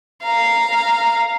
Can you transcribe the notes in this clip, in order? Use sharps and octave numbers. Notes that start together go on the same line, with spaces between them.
F5 A#5